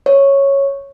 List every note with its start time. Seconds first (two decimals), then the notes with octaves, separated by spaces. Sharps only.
0.06 C#5